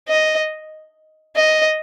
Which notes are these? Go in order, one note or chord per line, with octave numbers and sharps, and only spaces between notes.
D#5
D#5